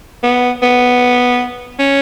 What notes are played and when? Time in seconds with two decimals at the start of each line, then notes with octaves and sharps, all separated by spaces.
0.23 B3
0.63 B3
1.80 C#4